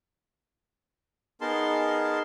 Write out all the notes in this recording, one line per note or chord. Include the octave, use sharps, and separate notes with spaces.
B3 D#4 G#4 A#4 A5 C6